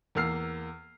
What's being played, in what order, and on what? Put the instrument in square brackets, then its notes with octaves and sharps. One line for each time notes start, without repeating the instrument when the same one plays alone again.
[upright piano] E2 A#3 E6 F6 C7